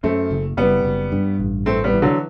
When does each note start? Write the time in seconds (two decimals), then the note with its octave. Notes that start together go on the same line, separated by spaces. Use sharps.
0.03 F#2 A3 C4
0.31 F#1
0.57 F#1 G3 B3
0.85 F#1
1.12 G2
1.39 A1
1.65 E3 A3 C4
1.84 G3 B3
1.94 E3
2.02 D3 F#3